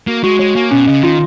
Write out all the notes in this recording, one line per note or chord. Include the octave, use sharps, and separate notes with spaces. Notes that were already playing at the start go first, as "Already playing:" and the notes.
A#3 F#4
G#3 F#4
G#3 C#5
A#3 G#5
B2 C#4
C#3 D#5
D#3 F4